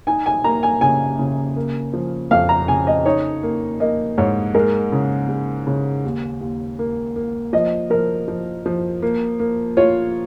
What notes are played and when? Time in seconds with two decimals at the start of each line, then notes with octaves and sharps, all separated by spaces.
0.07 D#4 G#5
0.26 G#5
0.44 A#3 A#5
0.63 G#5
0.81 C#3 G#5
1.19 C#3
1.56 A#3
1.93 F3
2.31 F2 F5
2.49 A#5
2.68 C#3 G#5
2.87 D#5
3.05 D#4 C#5
3.43 A#3
3.80 A#3 D#5
4.18 G#2 C#5
4.54 G#3 A#4
4.92 C#3
5.29 G#3
5.67 C#3
6.04 D#2
6.41 D#2
6.79 A#3
7.16 A#3
7.53 F3 D#5
7.90 F3 A#4
8.28 F3
8.66 F3
9.02 A#3
9.39 A#3
9.77 F4 C#5